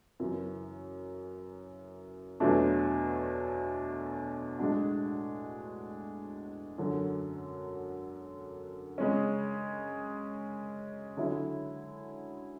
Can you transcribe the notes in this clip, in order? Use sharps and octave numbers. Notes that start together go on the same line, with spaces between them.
F#2 C#3 E3
E2 B2 F#3 A3 D4
A2 G#3 D4 F#4
F#2 D3 F#3
C#3 G#3 C#4
D3 F#3 C#4 E4